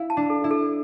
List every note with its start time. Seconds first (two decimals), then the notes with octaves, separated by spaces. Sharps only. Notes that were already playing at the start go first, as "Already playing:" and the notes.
Already playing: E4 F5
0.10 A5
0.17 D4
0.30 A4
0.44 E4
0.51 A4